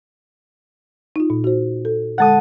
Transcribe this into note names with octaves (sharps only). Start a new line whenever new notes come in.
D#4 F4
A#2
F#4 C5
A4
D3 G#3 A4 F#5 A5 D#6